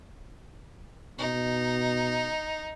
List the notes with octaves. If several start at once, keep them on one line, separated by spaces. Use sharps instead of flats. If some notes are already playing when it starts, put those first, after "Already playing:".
B2 D#4